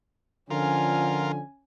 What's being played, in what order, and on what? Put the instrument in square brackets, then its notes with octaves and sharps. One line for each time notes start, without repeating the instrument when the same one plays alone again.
[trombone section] D3 F3 [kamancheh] C#4 G#5 [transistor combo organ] F4 A#4